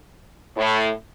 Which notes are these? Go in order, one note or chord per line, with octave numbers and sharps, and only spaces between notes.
A2